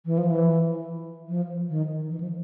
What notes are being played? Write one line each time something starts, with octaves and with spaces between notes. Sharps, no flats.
E3
F3
E3
F3
D#3
E3
F3